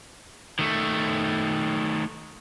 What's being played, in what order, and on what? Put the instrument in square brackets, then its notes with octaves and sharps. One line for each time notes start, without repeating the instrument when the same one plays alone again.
[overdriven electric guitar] D#3 A3